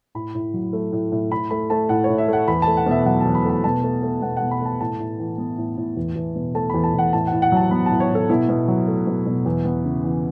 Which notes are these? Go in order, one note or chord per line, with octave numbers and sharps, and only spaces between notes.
A2 B5
A2
F#3
A3
A2
A2
A2 B5
A3 B5
A3 A5
A2 F#5
C#5
A2
E5
A3 F#5
E2 B5
A3 A5
F#5
B2 E5
F#3 F#5
E2 A5
B5
A3
B5
B2 A5
A3
A3
B2 F#5
F#5
B2
B5
A3 A5
A2 A5
A2
E3
B3
A2
A2
E2
E2
B2
A3 A5
E2 B5
A5
E2 F#5
A2 A5
F#5
A2
F#5
F#3 A5
B3 B5
A2 A5
C#5
A2
A4
B2 E4
B2
F#3
A3
B2
B2
E2
B3
C#3
E3